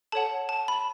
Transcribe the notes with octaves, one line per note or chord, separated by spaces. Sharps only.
A4 C#5 F#5 A5
A5
B5